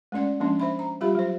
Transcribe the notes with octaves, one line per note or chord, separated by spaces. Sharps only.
G#3 A3 C#4 D5 F#5
F3 G#3 A#3 C#4 D4
C5 E5 B5
A#5
G3 F4 G4 E5 B5
F#3 C5